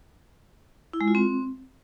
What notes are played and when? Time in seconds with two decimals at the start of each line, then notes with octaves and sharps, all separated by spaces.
0.93 E4
1.01 G#3
1.08 F4
1.15 C4